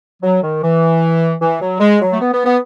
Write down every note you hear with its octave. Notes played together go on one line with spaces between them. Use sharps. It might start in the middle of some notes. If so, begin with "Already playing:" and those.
F#3
D#3
E3
E3
F#3
G#3
F#3
A3
B3
B3
B3